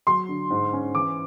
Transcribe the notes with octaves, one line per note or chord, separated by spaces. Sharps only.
F#3 C6
D3
G#2
C#4
E3 D6